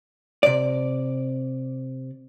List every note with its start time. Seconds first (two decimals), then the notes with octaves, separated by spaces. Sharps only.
0.43 C3 D5